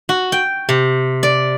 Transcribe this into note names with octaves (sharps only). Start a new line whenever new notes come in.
F#4
G5
C3
D5